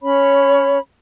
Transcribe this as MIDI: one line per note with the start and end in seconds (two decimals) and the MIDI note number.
0.01 0.79 61
0.01 0.79 73
0.01 0.79 83